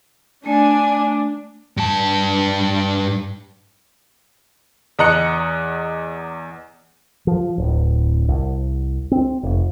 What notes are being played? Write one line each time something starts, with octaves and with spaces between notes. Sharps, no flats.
A3 D4 G#5
G2 A5
E2 D#5 A#5 F#6 C#7
F3
D1
C2
C4
F1